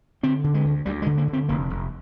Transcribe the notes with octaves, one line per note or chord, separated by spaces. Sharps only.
D3 C4
D3
G#3
D2
D2 G3
G#3
D3
A#3
D3
C4
F1 A#3
F1